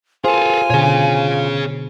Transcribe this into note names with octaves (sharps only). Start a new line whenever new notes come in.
F4 G#4 A4 C5 G#5
B2 D3 G#4 C#5